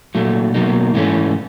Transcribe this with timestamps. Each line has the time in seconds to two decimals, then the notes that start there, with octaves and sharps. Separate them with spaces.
0.15 A#2 F#3 A3
0.54 B2 F#3 A#3 D#4
0.94 G#2 E3 A3 C#4